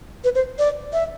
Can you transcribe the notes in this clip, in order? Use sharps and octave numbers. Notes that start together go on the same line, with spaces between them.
B4
C5
D5
E5